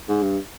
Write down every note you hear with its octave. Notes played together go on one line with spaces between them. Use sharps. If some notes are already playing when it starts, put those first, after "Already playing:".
G#2
G2